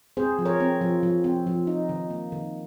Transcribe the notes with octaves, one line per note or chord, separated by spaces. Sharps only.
C4 G#4 C5
F3
A#4 C#5
C4
F3
F3
C4
F3
D#4
D#3
A#3
D#3